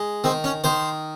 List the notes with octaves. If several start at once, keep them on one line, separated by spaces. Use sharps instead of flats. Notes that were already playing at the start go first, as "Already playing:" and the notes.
Already playing: G#3
D#3 C4
C#4
D#3 C5